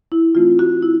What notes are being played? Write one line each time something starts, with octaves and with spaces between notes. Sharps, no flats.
E4
E3 A3 C4 F4
F#4
E4